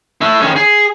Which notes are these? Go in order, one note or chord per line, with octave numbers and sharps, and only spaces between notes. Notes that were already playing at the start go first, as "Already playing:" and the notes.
A3 E4
D#3 C#4
G#4